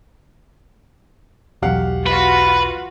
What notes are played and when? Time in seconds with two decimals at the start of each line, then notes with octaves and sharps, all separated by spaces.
1.62 B1 E2 F#3 G4 F5 F#5
2.07 F4 F#4 B4